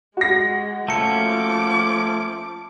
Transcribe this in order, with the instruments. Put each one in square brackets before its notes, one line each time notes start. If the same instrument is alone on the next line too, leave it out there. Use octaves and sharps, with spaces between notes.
[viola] G#3 [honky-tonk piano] F#4 A#6
[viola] F3 D6 [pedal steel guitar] A3 A#3 C#4 [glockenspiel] A5 C#7